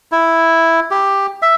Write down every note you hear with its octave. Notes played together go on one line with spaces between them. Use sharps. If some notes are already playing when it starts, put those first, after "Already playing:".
E4
G4
E5